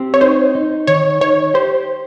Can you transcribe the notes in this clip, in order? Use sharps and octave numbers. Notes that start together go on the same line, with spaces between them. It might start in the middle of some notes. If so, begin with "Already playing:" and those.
Already playing: C4 G4
C#5
D#4 C5
D#4
D#3 C#5
D#4 C#5
G4 C5